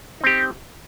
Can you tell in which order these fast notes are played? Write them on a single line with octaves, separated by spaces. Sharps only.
D#4 C4 G4